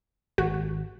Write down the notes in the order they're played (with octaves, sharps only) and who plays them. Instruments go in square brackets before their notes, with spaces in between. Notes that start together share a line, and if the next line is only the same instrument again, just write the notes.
[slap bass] G#1 [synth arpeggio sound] F#4